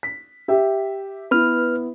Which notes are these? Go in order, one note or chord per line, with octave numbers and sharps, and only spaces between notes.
B6
G4 E5
B3 E4 B4 F6